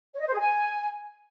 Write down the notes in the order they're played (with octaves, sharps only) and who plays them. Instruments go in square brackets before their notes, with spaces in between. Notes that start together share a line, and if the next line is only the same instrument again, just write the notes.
[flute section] C#5
D#5
C5
G#4
G#5